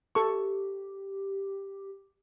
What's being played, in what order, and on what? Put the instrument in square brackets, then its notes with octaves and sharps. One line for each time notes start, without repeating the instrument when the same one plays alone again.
[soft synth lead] G4 [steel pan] A4 C#6